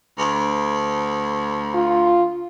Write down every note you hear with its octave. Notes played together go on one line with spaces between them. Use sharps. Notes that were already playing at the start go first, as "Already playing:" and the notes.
D2
F4